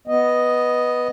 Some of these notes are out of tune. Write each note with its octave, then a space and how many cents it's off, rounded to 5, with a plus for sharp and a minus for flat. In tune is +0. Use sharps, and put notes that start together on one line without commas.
B3 +0 D#5 +0